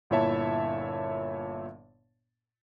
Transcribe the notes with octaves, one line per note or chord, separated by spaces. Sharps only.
G1 A#2 E4 C#5 E5 A5